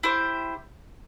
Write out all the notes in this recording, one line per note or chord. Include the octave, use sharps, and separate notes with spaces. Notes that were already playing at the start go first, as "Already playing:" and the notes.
E4 G4 C5